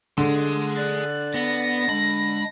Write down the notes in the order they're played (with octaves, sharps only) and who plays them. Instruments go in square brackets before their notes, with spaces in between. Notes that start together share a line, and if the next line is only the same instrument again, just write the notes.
[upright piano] D3 [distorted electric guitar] G#4 C6
[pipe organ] D5 [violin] F#6
[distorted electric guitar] B3 [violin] A#6
[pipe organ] G#3 D4 [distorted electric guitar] B5